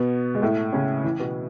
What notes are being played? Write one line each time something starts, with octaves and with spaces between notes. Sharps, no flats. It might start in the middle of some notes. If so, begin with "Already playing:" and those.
Already playing: B2 B3
G#3
A2 A3
C#3 C#4
E3 E4
B2 B3